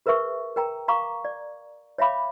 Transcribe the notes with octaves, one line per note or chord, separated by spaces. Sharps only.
G#4 A#4 B4 E5 C#6
A#4 G5 A#5
F5 A#5 C#6 D6
D5
C#5 E5 F5 B5 D6